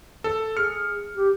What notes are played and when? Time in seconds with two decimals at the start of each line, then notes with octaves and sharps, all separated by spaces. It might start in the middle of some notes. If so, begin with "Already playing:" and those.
0.24 A4
0.57 G#4 F6 C#7
1.15 G4